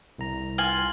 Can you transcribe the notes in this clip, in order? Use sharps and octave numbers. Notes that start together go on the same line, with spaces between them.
C2 A#5
F4 G#5 F6 F#7 G7